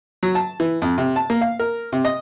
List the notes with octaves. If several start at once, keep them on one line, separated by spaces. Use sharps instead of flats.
F#3
A5
E3
F2
C3
A5
A#3
F5
A#4
C3
D#5